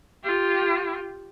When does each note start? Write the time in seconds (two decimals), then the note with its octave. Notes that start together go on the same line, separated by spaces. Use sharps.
0.24 F4 G4